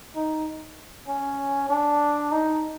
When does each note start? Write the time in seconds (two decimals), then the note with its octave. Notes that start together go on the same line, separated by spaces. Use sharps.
0.15 D#4
1.08 C#4
1.69 D4
2.32 D#4